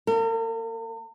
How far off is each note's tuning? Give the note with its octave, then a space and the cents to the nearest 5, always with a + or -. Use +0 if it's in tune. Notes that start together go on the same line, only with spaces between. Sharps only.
A#3 +0 A#4 -45